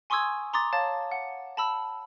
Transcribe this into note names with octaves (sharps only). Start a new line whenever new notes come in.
G#5 C6 C#6 D#6 E6 G#6
A#5 C6 D6 D#6 A6
C#5 F5 A5 A6
F#5
A5 B5 E6